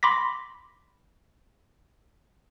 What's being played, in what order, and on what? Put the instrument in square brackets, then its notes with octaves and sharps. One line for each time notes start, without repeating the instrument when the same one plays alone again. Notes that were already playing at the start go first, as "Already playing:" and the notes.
[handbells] B5 C6 D6 A#6 B6